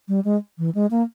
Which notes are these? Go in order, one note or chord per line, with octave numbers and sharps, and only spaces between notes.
G3
G#3
E3
G#3
A#3